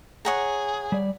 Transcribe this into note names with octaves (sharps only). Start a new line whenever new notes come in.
G#4 C#5 F#5 A#5
G3 D5